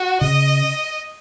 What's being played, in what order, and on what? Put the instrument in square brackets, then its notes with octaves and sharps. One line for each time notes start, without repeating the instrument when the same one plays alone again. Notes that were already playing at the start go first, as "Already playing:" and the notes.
Already playing: [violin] F#4
[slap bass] C#3 [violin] D#5